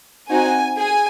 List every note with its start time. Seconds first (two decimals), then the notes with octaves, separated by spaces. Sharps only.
0.30 C4 D#4 F#4 G#5
0.77 G#4 G#5